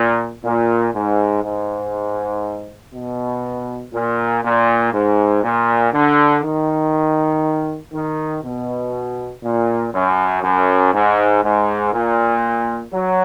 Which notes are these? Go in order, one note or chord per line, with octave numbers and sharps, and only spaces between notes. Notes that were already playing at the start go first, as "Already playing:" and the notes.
Already playing: A#2
A#2
G#2
G#2
B2
A#2
A#2
G#2
A#2
D3
D#3
D#3
B2
A#2
F#2
F#2
G#2
G#2
A#2
F#3